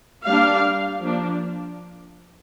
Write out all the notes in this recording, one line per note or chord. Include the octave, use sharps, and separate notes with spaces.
G3 A#3 D4 F5
F3 A#3 D4